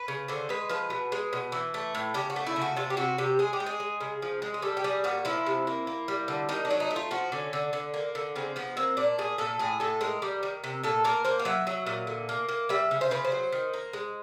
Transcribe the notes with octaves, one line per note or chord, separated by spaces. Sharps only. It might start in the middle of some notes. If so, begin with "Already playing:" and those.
Already playing: B4
C#3
D3 C5
G#3 B4
F3 B4
B2
G#3
B2
E3
A3
A2
C#3 G4
F#4
A3
E4
C#3
F#4
C3 F4
G4
C3 F#4
C3 G4
G#3 G#4
G4
G#3
G#4
G#3
C#3
F3
G#3
G#4
G3 A4
G4
G3 G#4
A#2 F#4
F3 E4
C3
A#3
A#3
G3
D3
D#3 D#4
D4
F#3
D#4
A3
F4
F3 F#4
D3 C#4
D3
D3
A#3
D3
C#3 C4
F3 B3
A#3 C4
A#2 D4
A#2 G#4
A#2 A4
A2 G#4
A2 A4
G#3 A#4
G3
D#3
C3
A#2 A4
A#3 A#4
A#3 C5
F5
F#3 E5
F#3
A#2
D3
A#3
A#3
G3 E5
C#3
C5
C#3 B4
C5
F#3
D#3
A#3
G#3